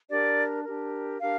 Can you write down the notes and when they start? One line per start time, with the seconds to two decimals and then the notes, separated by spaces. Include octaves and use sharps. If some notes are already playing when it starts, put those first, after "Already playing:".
0.09 D4 G4 A#4 D5
0.64 D4 G4 A#4
1.20 D4 G4 A#4 F5